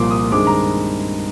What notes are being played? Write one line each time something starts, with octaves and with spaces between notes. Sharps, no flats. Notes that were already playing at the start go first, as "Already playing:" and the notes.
Already playing: C2 A#2 F3 A#3 C6 D6
D#6
G2 D#3 G#3 C4 D6
A#5